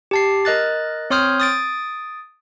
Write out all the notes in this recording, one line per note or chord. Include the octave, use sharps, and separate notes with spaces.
G4 A5 C7
A#4 D#5 F#6 A6
C4 C#5 C6 D#6 F6 G6
D#6 A6 D7